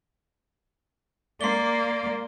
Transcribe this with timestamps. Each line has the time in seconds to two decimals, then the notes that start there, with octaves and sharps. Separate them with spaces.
1.41 A#3 D5 C6 G7